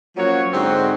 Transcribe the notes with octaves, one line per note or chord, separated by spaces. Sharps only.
F3 F#3 A#3 C#4 F#4 C#5
G#2 D3 C4 F#4